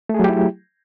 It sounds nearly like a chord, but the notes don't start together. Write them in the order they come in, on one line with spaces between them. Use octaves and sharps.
A3 G#4 F#3 G4 E4